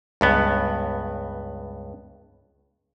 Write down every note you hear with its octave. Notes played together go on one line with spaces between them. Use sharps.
C#2 G2 B3